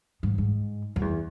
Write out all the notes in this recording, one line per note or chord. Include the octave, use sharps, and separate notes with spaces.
G#2
G#2
F#2
E2